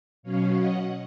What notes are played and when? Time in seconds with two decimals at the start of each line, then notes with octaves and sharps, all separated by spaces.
0.23 B2 F#3 C#4 C#5 F5
0.53 D#5 F#5